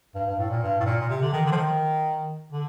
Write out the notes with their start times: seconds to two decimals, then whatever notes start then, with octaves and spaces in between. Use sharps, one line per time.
0.15 G2
0.27 G2
0.39 A2
0.50 A#2
0.63 G2
0.80 A2
0.86 A#2
1.01 A#2
1.10 C3
1.22 D3
1.33 D#3
1.46 D3
1.52 F3
1.57 D#3
2.52 D3